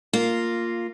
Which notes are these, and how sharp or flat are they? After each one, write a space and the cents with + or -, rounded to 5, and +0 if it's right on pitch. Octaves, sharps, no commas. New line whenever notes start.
A#3 -10 F4 +0